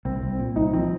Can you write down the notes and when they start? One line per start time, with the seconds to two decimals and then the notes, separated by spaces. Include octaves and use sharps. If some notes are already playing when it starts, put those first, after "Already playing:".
0.05 C2 C4
0.22 C2
0.31 C4
0.39 A#2
0.56 C2 D#4
0.73 F3 C4